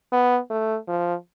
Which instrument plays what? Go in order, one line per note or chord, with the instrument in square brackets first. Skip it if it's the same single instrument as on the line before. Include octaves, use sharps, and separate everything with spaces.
[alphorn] B3
A3
F3